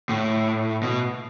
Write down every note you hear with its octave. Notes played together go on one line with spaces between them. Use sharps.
A2
B2